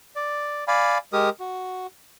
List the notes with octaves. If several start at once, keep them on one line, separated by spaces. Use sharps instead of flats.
D5
D5 F5 G#5 B5
G#3 G4 A#4 D#6
F#4